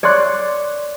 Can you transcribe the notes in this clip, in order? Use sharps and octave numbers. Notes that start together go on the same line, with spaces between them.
C#5 D5 C6 D6 F#6